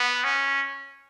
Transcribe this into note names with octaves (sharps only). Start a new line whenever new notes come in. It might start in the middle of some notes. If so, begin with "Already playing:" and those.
Already playing: B3
C#4